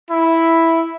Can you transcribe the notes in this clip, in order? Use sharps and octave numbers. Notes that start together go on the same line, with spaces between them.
E4